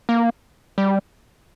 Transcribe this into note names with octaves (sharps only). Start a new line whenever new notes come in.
A#3
G3